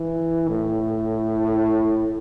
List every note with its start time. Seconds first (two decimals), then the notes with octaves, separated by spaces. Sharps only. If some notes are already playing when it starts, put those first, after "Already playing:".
Already playing: E3
0.48 A2